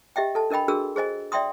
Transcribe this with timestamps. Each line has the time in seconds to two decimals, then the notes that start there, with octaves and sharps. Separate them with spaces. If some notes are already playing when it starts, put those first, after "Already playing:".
0.16 G4 D#5 E5 G5
0.35 A4 A5
0.50 D4 A#4 D#5 G5 B5
0.68 D4 F#4 G#4 A#4 E6
0.96 G#4 C5 D#5 G#5
1.32 D5 E5 G5 C6 D#6